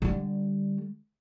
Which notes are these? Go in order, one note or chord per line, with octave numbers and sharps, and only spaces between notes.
D3 G3